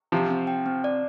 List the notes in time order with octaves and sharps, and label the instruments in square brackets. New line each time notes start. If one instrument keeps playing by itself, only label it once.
[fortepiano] C3 F3 [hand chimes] C4
[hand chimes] C4
G5
C4
D5